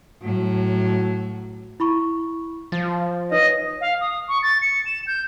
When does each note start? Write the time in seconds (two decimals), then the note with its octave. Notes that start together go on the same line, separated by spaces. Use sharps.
0.22 A2 F#3
1.80 E4 B5 C#6
2.72 F3 A6
3.32 D#4 B4 C#5 D#5
3.81 F5
4.01 D#6
4.28 C#6
4.43 A6
4.61 C#7
4.86 E7
5.07 G6